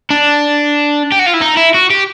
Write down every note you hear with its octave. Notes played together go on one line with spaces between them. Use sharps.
D4
G4
F#4
F4
E4
D#4
E4
F#4
G4